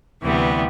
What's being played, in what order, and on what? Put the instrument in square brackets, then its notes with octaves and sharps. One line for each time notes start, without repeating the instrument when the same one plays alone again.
[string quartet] D2 C3 E3 G3 B3